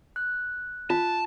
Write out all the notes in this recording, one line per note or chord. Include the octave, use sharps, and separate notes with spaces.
F#6
F4 A5